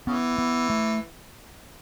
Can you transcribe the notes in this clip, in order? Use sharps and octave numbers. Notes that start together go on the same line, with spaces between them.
C#3 E3 B3
B3
A3